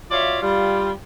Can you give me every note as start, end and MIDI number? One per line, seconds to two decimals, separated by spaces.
0.10 0.40 65
0.10 0.40 66
0.10 0.40 73
0.10 0.40 74
0.10 0.40 76
0.10 0.40 77
0.41 0.91 55
0.41 0.91 65